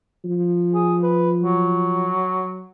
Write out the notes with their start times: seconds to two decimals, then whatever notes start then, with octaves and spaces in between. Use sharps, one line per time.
0.25 F3
0.74 G#4
1.03 B4
1.43 F#3